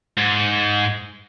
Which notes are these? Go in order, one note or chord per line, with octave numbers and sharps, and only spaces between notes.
G#2